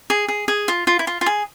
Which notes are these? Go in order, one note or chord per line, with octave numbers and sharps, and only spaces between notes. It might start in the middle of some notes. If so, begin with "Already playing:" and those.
G#4
G#4
G#4
F4
F4
E4
F4
F4
G#4